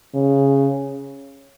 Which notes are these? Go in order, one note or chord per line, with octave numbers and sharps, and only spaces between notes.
C#3